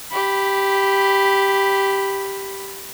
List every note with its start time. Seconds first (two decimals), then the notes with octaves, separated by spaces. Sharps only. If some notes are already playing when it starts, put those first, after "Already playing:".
0.11 G4 B5